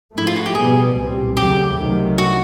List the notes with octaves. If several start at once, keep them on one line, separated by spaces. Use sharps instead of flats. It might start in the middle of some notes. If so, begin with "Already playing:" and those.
G#2 F3 A3 E4
F4
F#4
G4
B2 G3 B3 G#4
C2 A#2 G3 C4
D#2 C#3 F#3 A3 G4
C2 C3 D#3 F#3 A3
F#4